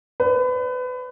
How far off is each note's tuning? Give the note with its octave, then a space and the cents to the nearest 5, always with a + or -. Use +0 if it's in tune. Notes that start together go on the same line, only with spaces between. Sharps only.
B4 +30 D5 -35